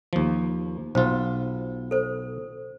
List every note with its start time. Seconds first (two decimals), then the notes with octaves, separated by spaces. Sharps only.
0.13 D#2 F3
0.95 B1 F4 C5
1.91 A4 C5